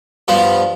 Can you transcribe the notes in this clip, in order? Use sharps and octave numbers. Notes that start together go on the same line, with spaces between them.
G2 F3 B3